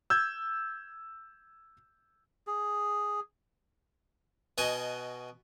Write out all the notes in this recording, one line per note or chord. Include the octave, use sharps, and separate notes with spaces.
E6 G6 G#6
G#4
B2 F#4 D#5 G#5